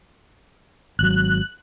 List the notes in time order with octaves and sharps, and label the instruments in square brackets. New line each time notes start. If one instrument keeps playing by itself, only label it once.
[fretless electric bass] G#1 F#3 [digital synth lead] F#6